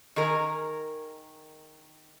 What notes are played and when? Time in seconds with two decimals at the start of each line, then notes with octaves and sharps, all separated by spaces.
0.16 D#3 G#4 A#4